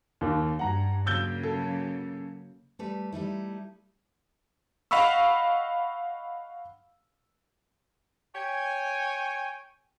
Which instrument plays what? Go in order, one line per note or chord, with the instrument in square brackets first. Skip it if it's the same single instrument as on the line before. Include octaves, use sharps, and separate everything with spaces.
[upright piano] D#2 D#3
[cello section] G2 [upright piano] F#5 A#5
[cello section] C#3 F#3 A#3 [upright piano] E6 G6 G7
[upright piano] A4
[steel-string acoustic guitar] G3 A3 B4
G3 A3 D#4 E4
[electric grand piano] D#5 F5 F#5 B5 C#6 E6
[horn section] C#5 G5 G#5